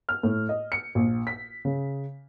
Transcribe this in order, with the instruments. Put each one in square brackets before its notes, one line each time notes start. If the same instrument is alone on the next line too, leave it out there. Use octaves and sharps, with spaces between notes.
[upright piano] F6
A2
D#5
C#7
A#1
B6
C#3